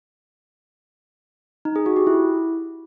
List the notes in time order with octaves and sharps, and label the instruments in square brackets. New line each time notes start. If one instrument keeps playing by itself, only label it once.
[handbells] D#4
G#4
F#4
G4
E4